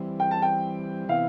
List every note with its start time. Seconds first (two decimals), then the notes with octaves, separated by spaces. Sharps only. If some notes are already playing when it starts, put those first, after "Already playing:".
Already playing: E3 G3 C4
0.20 G5
0.31 A5
0.42 G5
1.09 C3 E3 B3 E4 F5